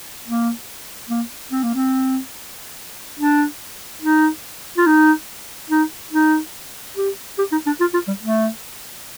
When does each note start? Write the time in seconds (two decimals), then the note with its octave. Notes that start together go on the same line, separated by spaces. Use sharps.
0.25 A#3
1.09 A#3
1.51 C4
1.63 A#3
1.74 C4
3.19 D4
4.02 D#4
4.77 F4
4.86 D#4
5.70 D#4
6.12 D#4
6.96 G4
7.38 G4
7.52 D#4
7.66 D4
7.80 F4
7.94 F4
8.08 G3
8.22 A3